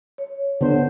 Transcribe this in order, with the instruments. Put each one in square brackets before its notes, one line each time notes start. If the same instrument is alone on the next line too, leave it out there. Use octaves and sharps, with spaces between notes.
[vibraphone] C#5
[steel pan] D3 B3 C5